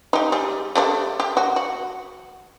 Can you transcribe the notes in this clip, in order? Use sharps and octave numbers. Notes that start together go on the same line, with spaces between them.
D#4 G4
G3 G#4
G3 A3 D4
G4
F#4
F#4